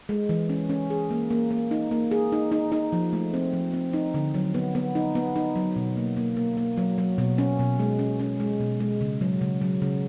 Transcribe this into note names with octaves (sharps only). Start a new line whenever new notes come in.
G#3
E3
C#4
C#4
G#4
A#3
A#3
A#3
D#4
A#3
G#4
D#4
D#4
D#4
F3
A3
C4
F3
C4
D#4
D3
F#3
B3
B3
D#4
B3
D#4
F#3
B2
A#3
A#3
A#3
A#3
F#3
F#3
B2
C#4
B2
G#3
C#4
C#4
G#3
B2
G#3
C#3
F#3
C#3
F#3
C#3